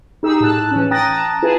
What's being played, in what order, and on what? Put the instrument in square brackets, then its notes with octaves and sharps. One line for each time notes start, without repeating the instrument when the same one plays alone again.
[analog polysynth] D#4 G4 G#4 E6
A2 A5 F#6
E3 C#4
G5 A#5 D#6 F#6 A6 A#6
A5 A#5
E4 F4 G#4 B4 G#5 A5